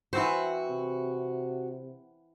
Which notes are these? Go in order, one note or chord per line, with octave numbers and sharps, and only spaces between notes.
E3 C4 F#4 C5
C3